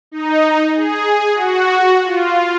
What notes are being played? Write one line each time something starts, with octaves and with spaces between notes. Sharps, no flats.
D#4
G#4
F#4
F4